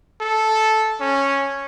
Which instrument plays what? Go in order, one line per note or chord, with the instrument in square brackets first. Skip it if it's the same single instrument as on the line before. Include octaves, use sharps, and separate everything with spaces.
[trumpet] A4
C#4